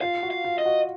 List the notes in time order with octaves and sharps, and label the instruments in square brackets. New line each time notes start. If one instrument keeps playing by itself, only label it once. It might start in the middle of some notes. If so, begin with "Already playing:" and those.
[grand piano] F4 [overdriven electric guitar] F5
[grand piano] F#4
[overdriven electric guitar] F5
[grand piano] F4
[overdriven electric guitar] D#5
[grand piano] F#4